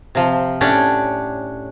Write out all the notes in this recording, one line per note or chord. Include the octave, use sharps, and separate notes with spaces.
C3 F3
A2 C#4 D4 G4 D5